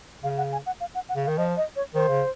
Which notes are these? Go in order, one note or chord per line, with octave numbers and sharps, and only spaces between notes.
C#3 F5
F#5
G#5
F#5
F5
F#5
F#5
C#3
F5
D#3
F3 D#5
D#5
C#5
D#3 C5
C#3